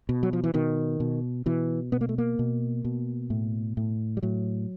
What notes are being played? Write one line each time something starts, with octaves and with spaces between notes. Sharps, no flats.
B2
F#3
F3
E3
B2 D#3
B2
B2 E3
B2 B3
A#3
A3
A#3
B2
B2
A2
A2
G3
A2 F#3